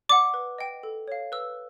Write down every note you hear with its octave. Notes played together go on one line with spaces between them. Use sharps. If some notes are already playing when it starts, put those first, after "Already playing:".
D5 F#5 D6
B4
D#5 G5
A4
C#5 F5
B4 E6